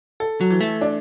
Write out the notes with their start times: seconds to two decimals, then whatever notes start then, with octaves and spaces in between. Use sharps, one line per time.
0.20 A4
0.41 F#3
0.50 E3
0.61 A3
0.81 D4